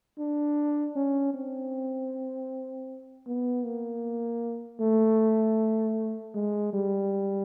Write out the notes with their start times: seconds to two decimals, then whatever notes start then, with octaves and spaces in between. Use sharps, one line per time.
0.19 D4
0.96 C#4
1.34 C4
3.27 B3
3.65 A#3
4.80 A3
6.35 G#3
6.73 G3